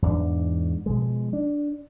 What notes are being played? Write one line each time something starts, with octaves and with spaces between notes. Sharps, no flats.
E2 G#2 C4 D4
B2 F3 G#3
D4